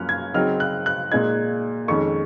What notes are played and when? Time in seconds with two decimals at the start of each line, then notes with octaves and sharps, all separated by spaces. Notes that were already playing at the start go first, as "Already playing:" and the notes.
Already playing: F#2 F3 A#3 C#4 F6 F#6
0.09 G#6
0.34 C#3 F#3 C4 D#4 F6
0.60 F#6
0.86 F#6
1.12 A#2 G#3 D#4 G#6
1.88 F2 D#3 G#3 C#4 C#6